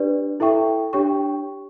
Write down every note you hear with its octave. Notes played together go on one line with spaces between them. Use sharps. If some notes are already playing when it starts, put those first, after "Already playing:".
Already playing: D4 G4 B4 D5
E4 A4 E5 G5 C#6
D4 G4 C#5 G5 C#6